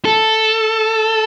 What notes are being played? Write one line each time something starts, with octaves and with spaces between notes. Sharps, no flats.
A4